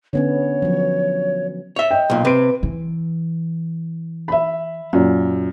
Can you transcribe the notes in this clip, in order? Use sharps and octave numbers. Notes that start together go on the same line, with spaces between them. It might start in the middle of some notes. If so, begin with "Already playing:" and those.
D3 B3 C#4 C#5
F3 F#3
C#5 E5
D#5 G5
B1 A#2
C3 B4 D7
E3
E5 B5
F#2 A#2